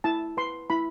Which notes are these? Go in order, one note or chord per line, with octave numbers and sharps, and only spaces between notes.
E4 A5
B4 C6
E4 B5